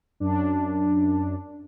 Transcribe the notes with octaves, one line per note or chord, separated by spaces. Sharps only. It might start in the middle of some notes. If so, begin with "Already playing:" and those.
F#2 D4